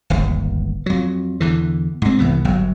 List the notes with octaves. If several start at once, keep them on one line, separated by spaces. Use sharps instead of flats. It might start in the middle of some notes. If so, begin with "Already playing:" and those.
D1 G1 D#2
F2 F#3
E2 D3 E3
G#2 C4
C2 E3 B3
G1 F#3